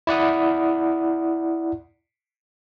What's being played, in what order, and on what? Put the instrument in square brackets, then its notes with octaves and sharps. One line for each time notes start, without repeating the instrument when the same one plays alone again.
[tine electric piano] E4 D5 F#5 D#6